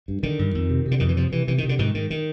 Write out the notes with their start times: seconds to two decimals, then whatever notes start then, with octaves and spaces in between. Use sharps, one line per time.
0.08 G2
0.23 D3 D#3
0.39 G2
0.55 F2
0.70 C3
0.86 C3
0.91 D3
1.00 F2 D#3
1.09 E3
1.16 C3 F3
1.32 C3 E3
1.47 C3 E3
1.58 D#3
1.63 C3
1.69 D3
1.79 G#2 D#3
1.94 G#2 D#3
2.10 D#3